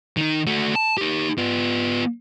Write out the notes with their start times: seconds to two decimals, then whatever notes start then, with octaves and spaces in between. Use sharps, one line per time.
0.17 D#3 D#4
0.47 A3 F#4
0.75 A5
0.98 D#4 G4
1.38 B3 F4